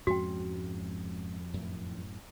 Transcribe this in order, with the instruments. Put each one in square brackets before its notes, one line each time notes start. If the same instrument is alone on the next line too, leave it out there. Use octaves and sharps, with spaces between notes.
[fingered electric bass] F2 [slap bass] G#2 G#3 C#4 [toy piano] F#4 G5
[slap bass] F#2 A2